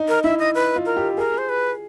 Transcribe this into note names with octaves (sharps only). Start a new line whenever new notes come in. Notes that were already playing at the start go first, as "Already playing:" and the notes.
Already playing: D#4
A#4
E4 E5
D#5
B4
F4
A#4
G4
G#4 A#4
C5
B4